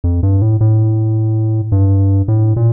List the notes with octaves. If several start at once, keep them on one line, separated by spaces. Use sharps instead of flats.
F2
G2
A2
A2
G2
A2
A#2